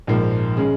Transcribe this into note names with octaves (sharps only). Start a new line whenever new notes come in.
A#1 G#2 F3 A#3
C#3 G#3